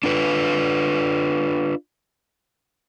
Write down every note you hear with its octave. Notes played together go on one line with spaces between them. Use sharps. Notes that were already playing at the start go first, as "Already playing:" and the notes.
D4 F4 B4